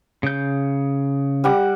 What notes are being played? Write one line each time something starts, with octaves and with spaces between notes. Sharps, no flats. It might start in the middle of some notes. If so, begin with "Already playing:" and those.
C#3 G6
G3 F#5 D6